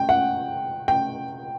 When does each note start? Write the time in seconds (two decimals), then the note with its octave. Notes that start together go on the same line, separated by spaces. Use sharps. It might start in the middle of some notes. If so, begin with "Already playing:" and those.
Already playing: G5
0.09 F#5
0.88 G5